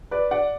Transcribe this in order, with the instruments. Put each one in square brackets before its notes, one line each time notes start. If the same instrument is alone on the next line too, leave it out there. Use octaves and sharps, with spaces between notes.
[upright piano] B4 D5
D5 F#5